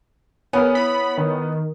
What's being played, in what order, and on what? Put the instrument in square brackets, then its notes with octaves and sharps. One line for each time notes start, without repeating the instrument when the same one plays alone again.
[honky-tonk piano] B3 [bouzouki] C#4 [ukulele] G#4 A#4 G#5
[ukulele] E4 [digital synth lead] B5
[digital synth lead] D#3